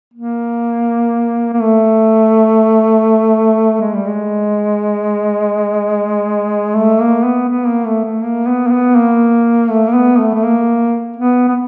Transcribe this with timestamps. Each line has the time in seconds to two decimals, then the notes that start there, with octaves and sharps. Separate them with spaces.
0.14 A#3
1.53 A#3
1.61 A3
3.81 G#3
3.94 G3
4.08 G#3
6.75 A3
7.01 A#3
7.25 B3
7.49 B3
7.67 A#3
7.85 A3
8.04 A3
8.23 A#3
8.47 B3
8.67 A#3
8.72 B3
8.96 A#3
9.70 A3
9.88 A#3
9.94 B3
10.19 A3
10.34 A3
10.43 A#3
11.16 B3
11.48 B3